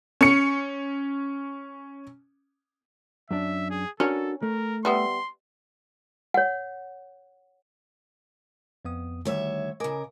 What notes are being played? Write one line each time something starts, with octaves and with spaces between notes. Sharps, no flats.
C#4 C#7
F#2 D4 E5
G#4
C#4 D4 F#4 A4 A#4
A3 A#4
G3 B3 E5 C6
C#5 F#5
F2 B3 D#6
D2 D#3 G3 C#5 E5
C#3 A#4 D#5 G#5 D6